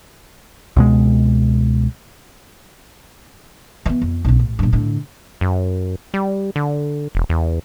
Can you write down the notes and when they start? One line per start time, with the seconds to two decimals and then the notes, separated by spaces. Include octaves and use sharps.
0.76 C#2 B2 G#3
3.86 E3 B3
4.02 F2
4.25 B1 C#3
4.39 A1
4.59 G2 A#2
4.73 A2 D3
5.41 F#2
6.14 G3
6.56 D3
7.15 E1
7.29 E2